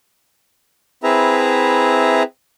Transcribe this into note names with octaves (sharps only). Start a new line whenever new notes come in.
C4 E4 G#4 B4 E5 A#5